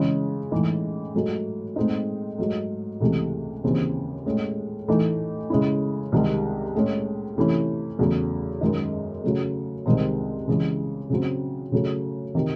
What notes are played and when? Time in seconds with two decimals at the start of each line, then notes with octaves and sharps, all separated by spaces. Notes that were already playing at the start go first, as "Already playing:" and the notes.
Already playing: C#3 E3 G#3 C#4
0.51 A2 E3 G#3 D#4
1.14 G#2 F#3 A3
1.76 A2 G#3 C4 D#4
2.38 G#2 F#3 A3
3.00 C#2 C3 E3 A3
3.64 D#2 C#3 E3 C4
4.26 A2 G#3 C#4
4.88 A2 E3 A3 D#4
5.50 C#3 G#3 C#4 E4
6.12 C2 C3 D#3 G#3
6.75 A2 G#3 C#4
7.37 C3 E3 A3 C#4 E4
7.99 E2 C#3 F#3 A3
8.61 F#2 D#3 G#3 D#4
9.23 C#3 F#3 A3
9.86 C2 C3 D#3 G#3 C4
10.47 C#3 E3 G#3
11.10 C#3 F#3 C4
11.72 C#3 F#3 A3
12.35 C3 D#3